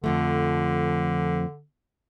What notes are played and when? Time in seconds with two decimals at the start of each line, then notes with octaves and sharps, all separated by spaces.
0.04 F2 D3 F3 A3